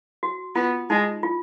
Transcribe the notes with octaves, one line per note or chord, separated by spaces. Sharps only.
F#4
B3 F4
G#3 D#4
F4